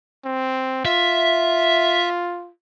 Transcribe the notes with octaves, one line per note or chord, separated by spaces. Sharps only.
C4
F4 E5